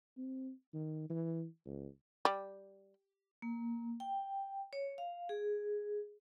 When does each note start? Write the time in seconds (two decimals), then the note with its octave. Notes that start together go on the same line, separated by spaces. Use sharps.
0.17 C4
0.74 D#3
1.10 E3
1.66 C#2
2.25 G3
3.42 A#3
4.00 G5
4.73 C#5
4.98 F5
5.29 G#4